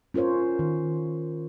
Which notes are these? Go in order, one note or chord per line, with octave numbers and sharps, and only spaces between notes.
C#4 F4 A#4 C5 C#5
D#3